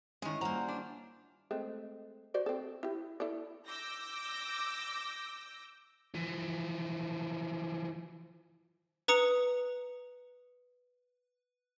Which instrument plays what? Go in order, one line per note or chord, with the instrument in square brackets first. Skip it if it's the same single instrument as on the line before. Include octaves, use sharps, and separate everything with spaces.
[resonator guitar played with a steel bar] D#3 G#3 [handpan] C#4 E4 [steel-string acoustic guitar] D#5
[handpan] G3 F4 C5 [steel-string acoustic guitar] A#3 F#4 [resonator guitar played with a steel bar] A#5
[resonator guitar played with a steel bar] D4
[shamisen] G#3 A3 C4
F#4 C5 D5
C4 A4
E4 G4
E4 A4 D5
[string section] D6 E6 G6 A#6
[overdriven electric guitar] E3 F3
[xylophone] B4 A#5 D#6 C#7